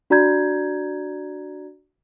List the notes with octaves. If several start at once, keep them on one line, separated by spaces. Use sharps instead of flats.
D4 F#4 D5 A#5 G6 G#6